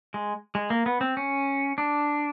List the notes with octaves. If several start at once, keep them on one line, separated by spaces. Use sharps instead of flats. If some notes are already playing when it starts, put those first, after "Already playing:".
G#3
G#3
A#3
B3
C4
C#4
D4